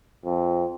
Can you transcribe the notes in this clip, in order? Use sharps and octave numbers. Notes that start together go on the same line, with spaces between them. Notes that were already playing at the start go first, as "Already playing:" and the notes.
F2